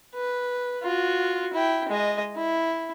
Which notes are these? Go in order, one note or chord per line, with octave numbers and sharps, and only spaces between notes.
B4
F4 F#4
E4 G5
G#3 D#5
E4